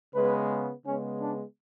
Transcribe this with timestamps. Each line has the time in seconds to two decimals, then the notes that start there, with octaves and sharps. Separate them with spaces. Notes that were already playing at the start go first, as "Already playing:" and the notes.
0.14 C#3 G#3 B3 B4
0.86 C#3 G#3 B3 C#4
1.21 D4